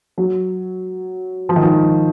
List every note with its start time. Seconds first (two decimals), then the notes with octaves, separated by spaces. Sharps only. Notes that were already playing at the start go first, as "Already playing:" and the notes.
0.18 F#3
1.49 F3
1.56 D#3
1.63 F3